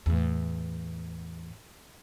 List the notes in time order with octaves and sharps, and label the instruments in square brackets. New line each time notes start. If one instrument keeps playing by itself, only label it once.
[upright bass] E2 A2